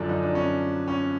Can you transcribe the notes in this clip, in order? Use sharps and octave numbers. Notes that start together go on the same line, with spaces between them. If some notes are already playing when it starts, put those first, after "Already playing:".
Already playing: F#2 D3 F3 D4
D#4
D4
C#4
C#4